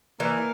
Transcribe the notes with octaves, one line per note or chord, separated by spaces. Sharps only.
E3 A#3